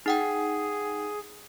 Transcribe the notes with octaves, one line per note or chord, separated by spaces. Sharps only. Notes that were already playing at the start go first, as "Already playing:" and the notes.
D#4 G#4 F#5 G5